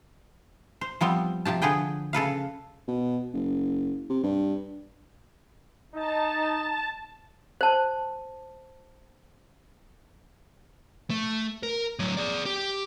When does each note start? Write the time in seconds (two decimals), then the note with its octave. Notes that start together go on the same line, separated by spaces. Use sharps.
0.81 C5
1.01 F3 G3 B3 C4
1.45 C3 F3 G4 A5
1.62 D3 F3 G#4 B4 G5
2.13 C#3 A4 B4 F5
2.88 B2
3.33 F#1
4.09 C3
4.23 G2
5.95 D#4 A5
7.61 C5 A5
11.10 A3
11.63 A#4
11.99 A2 F#3
12.17 G#4 D5
12.46 G4